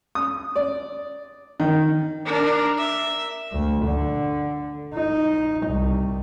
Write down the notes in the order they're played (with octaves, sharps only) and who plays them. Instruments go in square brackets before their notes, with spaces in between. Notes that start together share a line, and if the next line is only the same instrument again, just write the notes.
[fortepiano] D#6
D5
D#3
[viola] D4 A#4
E5
[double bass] D2
D3
D#4
C2